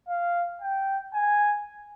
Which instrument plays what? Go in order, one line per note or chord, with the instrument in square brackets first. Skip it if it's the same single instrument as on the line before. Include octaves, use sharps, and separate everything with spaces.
[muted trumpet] F5
G5
G#5